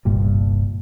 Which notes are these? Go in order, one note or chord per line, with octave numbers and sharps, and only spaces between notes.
G1 C2 G2 A#2